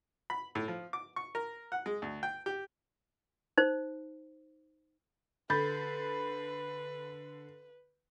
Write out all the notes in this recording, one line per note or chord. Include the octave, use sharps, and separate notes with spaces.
B5
A2
F3
D6
C#6
A#4
F#5
G#3
D2
G5
G4
D#4 C5
D3 B4 B5 G6 A6